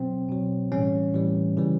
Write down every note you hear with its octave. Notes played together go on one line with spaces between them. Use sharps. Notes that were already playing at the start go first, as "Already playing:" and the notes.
Already playing: B2 F#3 C4
B2 F#3
A2 E3 G3 C#4
A2 E3 G3
C#3 E3 G3